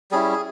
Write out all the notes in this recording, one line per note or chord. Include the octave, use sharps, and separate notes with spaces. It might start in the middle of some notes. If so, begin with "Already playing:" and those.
G3 C#4 E4 G#4